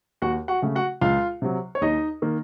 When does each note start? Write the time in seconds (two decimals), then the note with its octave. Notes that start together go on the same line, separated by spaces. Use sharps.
0.22 D#2 F#4 F#5
0.48 F#4 F#5
0.62 C#3 A3
0.75 F#4 F#5
1.01 C#2 F4 F5
1.42 C3 F#3
1.75 C#5
1.81 D#2 D#4 D#5
2.22 D#3 A#3